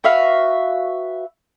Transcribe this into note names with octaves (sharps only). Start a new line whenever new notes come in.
F#4 B4 E5 F5